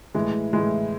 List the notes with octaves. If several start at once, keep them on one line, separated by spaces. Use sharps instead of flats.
A2 E3 G#3
A2 E3 G#3